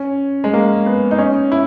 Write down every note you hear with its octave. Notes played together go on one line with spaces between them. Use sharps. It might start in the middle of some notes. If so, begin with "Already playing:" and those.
Already playing: C#4
G#3
A#3
B3
D#4
C#4
E4